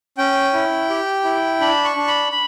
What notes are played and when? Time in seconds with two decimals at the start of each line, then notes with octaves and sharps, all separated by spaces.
0.18 C#4 G5
0.53 E4
0.90 G4
1.24 E4
1.60 D4 B5
1.85 C#6
1.97 D4
2.08 B5
2.32 B5